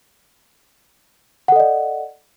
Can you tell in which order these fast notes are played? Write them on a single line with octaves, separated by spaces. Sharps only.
F#5 A4 D#5 D5